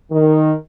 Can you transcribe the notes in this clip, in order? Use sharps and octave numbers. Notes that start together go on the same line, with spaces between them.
D#3